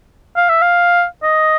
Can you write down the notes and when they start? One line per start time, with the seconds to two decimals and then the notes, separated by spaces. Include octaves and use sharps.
0.36 F5
0.49 E5
0.62 F5
1.23 D#5